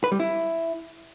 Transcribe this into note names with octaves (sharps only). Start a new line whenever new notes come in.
B4
G3
E4